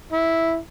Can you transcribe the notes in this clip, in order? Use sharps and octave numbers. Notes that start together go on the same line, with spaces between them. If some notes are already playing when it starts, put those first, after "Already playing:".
E4